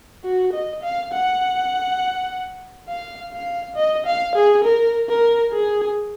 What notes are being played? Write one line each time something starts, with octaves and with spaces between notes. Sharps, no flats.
F#4
D#5
F5
F#5
F5
F5
D#5
F5
G#4
A#4
A#4
G#4